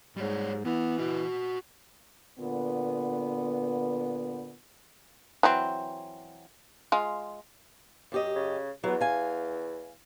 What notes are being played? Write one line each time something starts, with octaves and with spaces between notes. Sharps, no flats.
G#2 G3 C#5
E3 B3
F#4 D#5
A#2 D3 B3
E3 F#3 C4
G#3 F4
F#2 G4 D#5
C#3
E2 F#3 B3
F5 G#5